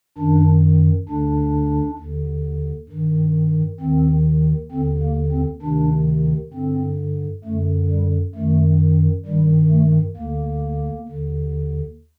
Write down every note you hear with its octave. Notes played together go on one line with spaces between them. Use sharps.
F#2 D#3 D4
D2 D3 D4
D#2 D3
G2 D#3
D#2 D#3 C4
D#2 D3 C4
A#3
C4
D2 C3 D#3 D4
G2 D3 C4
F#2 D3 A3
G3
F#2 D#3 A3
G2 D#3 G3
A3
D2 D3 A#3
D#2 D3